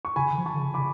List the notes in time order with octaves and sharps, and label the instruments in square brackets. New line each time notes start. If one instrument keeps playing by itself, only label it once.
[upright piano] C#6
[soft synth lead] C#3 [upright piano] G#5 B5
[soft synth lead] D3
F3
[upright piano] A5 C#6
[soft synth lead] D3
C#3
[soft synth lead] C#3 [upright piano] B5 D6